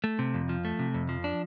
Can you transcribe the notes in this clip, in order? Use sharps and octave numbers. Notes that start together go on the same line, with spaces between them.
A3
C3
F2
F3
A3
C3
F2
F3
D4